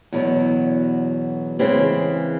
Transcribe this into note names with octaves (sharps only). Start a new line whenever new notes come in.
E2 B2 F#3
C#3 E3 G#3 C4